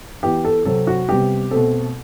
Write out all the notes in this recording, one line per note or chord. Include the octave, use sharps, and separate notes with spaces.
E3 B3 G4
A4
C3 F#3 C4 A4
F#4
C3 G3 B3 G4
B2 A3 C4 A4